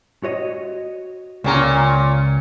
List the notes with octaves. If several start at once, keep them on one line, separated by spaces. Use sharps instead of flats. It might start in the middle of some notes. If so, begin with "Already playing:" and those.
F#4 C#5 D#5
C#2 A#2 C#4 A#4 G5 A#5